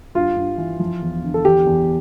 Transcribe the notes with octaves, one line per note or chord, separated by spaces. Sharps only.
G2 F4
G2
E3
F3
E2
D3
A4
E2 G4
E2